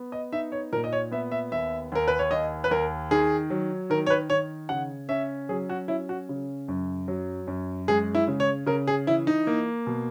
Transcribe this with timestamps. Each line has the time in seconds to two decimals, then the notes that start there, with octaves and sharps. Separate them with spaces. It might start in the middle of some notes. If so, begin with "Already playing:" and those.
Already playing: B3
0.12 D#5
0.32 D#4 E5
0.52 C#5
0.72 A#2 A#4
0.84 D#5
0.93 C#5
1.12 B3 E5
1.32 E5
1.52 D#2 E5
1.92 D#2 A#4
2.08 B4
2.19 C#5
2.31 D#2 D#5
2.64 B4
2.71 D#2 A#4
3.11 D#3 G#4
3.50 F#3
3.90 D#3 A#4
4.06 C#5
4.10 B4
4.30 D#3 C#5
4.69 C#3 F#5
5.09 C#4 E5
5.49 F#3 G#4
5.69 F#4
5.88 C#4 E4
6.09 F#4
6.29 C#3
6.68 F#2
7.08 F#3
7.47 F#2
7.88 G#3 G#4
8.15 E4
8.28 C#3
8.40 C#5
8.66 C#3 A#4
8.87 G#4
9.07 E3 E4
9.27 D#4
9.47 A#3
9.87 B2